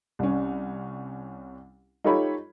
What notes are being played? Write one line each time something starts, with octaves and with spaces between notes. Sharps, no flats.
C2 C#4
D#4 F4 G4 A4 C#5 B5